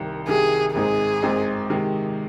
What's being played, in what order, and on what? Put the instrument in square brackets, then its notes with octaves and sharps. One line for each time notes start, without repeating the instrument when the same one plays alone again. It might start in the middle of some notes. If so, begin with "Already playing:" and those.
Already playing: [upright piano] C2 C3 D#3
[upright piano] C2 C3 D#3 [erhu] G#4
[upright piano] G#1 G#2 G#3 C4 D#4 [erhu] G#4
[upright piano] G#1 G#2 G#3 C4 D#4
C3 D#3 G#3